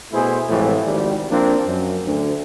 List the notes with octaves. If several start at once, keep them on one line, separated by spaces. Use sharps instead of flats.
B2 A3 E4 G#4 C5
A2 C3 E3 F3 G#3
G#1 G3
F3 A#3 C4 D4
F#2
D2